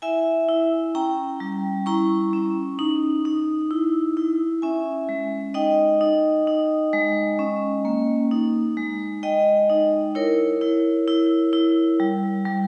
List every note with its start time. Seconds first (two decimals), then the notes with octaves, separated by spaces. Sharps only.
0.02 E4 E5 G#5
0.48 E4
0.95 C#4 G5 A#5
1.40 G3
1.86 E4 A#5 C#6
2.33 C#4
2.79 D#4
3.25 D#4
3.71 E4
4.17 E4
4.62 C#4 E5 G#5
5.09 G#3
5.54 D#4 D#5 G5
6.01 D#4
6.47 D#4
6.93 G#3
7.39 C#4
7.85 A#3
8.31 D#4
8.77 G#3
9.23 G#3 D#5 G5
9.69 D#4
10.15 E4 A#4 C#5
10.61 E4
11.08 E4
11.53 E4
12.00 G3
12.45 G3